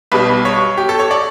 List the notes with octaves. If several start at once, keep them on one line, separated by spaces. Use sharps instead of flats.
B1 B2 G3 B4
C#5
G4
A4
C#5
D5